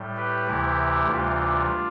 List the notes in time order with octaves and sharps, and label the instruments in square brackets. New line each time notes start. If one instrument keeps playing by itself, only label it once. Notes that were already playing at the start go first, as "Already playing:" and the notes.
Already playing: [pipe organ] A2 G3
G4 B4
D2 C3 E3 E4 G4
D2 C3 E3 G3 D4 F4